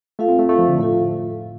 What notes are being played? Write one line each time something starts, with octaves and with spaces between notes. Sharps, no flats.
A3 F4 A4 F5
C4
A3
A3 F4 A4 F5
F3
D3
A2 F4 A4 F5